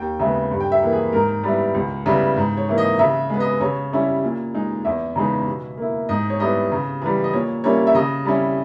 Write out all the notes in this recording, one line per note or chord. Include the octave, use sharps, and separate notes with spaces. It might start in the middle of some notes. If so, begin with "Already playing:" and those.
Already playing: D#2 G5
C#3 G#3 B3 E5
G2
G5
E5
E3 A#3
G#4
G#2 A#4
G3 B3 E4
C#2
C#3 G3 B3 E4
G#2
C#5
E3 A#3 E4
D#5
C#3 E5
G#3 B3
D#5
C#3 C#5
G3 C#4 E4
A#2
G#3 D#4
E2 E5
C#3 E3 G#3 D#4
B2
A#3 E4
G#2 D#5
C#5
G3 B3 E4 D#5
C#3
E3 G3
D#5
A#2 C#5
G3 A#3 C#4 E4 C#5
E5
C#3 D#5
G3 C#4 E4